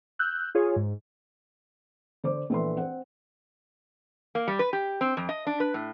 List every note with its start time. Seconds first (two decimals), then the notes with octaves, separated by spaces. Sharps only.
0.19 E6 F#6 G6
0.55 F4 G#4 C#5
0.76 G#2
2.24 D3 C5 D6
2.50 A#1 E3 A4 B4 E5 C6
2.77 C4 C5 F#5
4.35 A#3
4.48 G3
4.59 B4
4.73 G4
5.01 C4
5.17 F2
5.29 D#5
5.47 D4
5.60 B4
5.74 A2